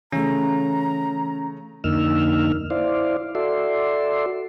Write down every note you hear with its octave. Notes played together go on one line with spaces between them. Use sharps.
C#3 E3 A3 C#4 A#5
F2 D3 A#3 D#4 E6 F6
E4 C5 D5 F5
F#4 A4 D5 E5 C6